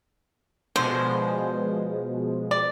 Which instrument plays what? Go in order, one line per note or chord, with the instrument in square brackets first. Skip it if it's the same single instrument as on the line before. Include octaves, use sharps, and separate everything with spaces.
[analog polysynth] B2 F3 G#3 [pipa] D3 [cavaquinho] C5
[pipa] D5